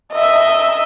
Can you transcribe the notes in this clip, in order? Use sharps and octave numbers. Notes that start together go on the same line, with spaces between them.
D#5 E5